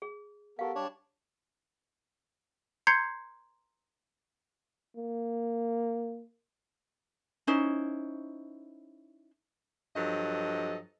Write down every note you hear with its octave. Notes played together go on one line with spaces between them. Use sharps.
G#4
B3 G4 A4 A#4 F5
G3 D4 C#5 D5 A5
A#5 C6 G6 G#6 C7 C#7
A#3
C#4 D#4 E4 C5
G2 F3 F#3 A4 D#5